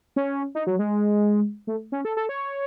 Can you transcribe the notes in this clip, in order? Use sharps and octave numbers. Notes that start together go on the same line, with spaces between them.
C#4
D#4
F#3
G#3
A3
C#4
A4
A4
C#5